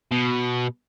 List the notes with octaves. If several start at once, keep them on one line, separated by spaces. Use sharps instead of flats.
B2